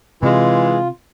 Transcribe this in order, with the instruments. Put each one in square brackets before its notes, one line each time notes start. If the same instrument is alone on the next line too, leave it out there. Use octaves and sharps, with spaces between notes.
[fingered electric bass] C3 [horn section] E3 G#3 [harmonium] F4